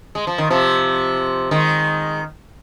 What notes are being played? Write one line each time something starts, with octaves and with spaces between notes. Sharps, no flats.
G#3
F3
D#3
C3 F3
D#3 G#3